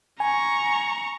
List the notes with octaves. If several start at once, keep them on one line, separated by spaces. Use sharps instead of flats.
G#5 A#5 C#6